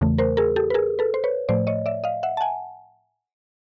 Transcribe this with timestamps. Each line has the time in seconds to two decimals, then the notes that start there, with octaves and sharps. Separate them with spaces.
0.01 E2 C#3 E3 A3
0.18 A#4 C5
0.37 G#4 A#4
0.56 G4 A4
0.70 B4
0.74 G#4 A#4
0.99 A4 B4
1.14 C5
1.24 B4 C#5
1.49 A2 F3 A3 C5 D5
1.67 C#5 D#5
1.86 D5 E5
2.04 D#5 F5
2.23 E5 F#5
2.37 A5
2.41 F#5 G#5